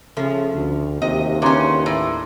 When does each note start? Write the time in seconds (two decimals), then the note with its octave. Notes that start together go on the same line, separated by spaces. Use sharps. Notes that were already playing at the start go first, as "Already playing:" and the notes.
0.17 C#3 F3 A3
0.53 D2
1.02 D#2 C3 D#5
1.42 C#3 E3 C#4 D4 A#5 C6
1.86 A2